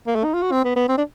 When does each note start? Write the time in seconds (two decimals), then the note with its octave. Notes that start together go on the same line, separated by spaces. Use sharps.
0.07 A#3
0.15 A3
0.24 D#4
0.34 F4
0.42 F#4
0.52 C4
0.64 B3
0.76 B3
0.89 C4
0.98 D4